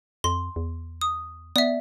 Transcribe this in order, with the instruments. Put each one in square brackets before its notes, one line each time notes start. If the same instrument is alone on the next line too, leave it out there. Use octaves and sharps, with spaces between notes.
[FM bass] F2 [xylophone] C6
[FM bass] E2
[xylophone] D#6
[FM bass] B3 [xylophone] D5 E5